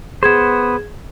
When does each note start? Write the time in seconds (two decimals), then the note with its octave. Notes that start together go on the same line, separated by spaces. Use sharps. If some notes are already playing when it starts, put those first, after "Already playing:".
0.23 B3 G#4 C5 G#6 E7